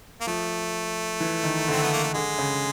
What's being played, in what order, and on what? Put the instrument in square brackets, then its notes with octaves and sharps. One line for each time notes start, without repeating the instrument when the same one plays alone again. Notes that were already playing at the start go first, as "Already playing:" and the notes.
[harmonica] A#3
[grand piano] F3 [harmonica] A3
[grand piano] E3
D#3
D3
[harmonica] C4
B3
A#3
A3
[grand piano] D3 [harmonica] G#3
[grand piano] C#3